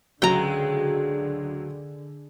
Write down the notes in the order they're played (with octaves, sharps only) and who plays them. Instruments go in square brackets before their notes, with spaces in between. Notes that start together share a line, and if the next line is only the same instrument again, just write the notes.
[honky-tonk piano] C#2 F#3 [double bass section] D3 [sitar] G#3 [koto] G5 A#5